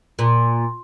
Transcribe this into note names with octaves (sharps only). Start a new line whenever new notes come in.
A#2